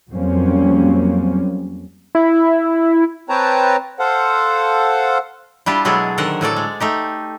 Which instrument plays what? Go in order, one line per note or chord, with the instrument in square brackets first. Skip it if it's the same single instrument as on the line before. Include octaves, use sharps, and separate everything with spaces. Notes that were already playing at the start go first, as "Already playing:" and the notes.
[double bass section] F2 F#3 G3 A#3 C4 C#4
[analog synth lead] E4
[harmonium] C4 B4 C#5 G5 A5 A#5
A4 C5 F5 F#5
[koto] G3 D4 E4 F4 G4
B2 F#3 G#3 E4 G#4 A4
D3 D#3 A#4 C5 F#5
A2 F#3 A4 D5
G#3
A3 D#4 G4